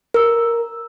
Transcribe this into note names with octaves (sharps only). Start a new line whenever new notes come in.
A#4 E6